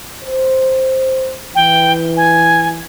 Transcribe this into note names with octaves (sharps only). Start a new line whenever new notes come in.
C5
E3 G5
G#5